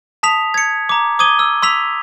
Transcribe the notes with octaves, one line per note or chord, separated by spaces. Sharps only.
A5 D#6 B6 F7
G#6 C#7
A#5 D6
D6 D#6 G#6 D#7 G7
E6
C6 E6 B6 F7